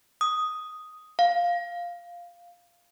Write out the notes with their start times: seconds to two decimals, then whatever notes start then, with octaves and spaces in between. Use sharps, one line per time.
0.21 D#6
1.19 F5